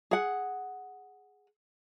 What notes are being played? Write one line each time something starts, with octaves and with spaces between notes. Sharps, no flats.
G#4 F#5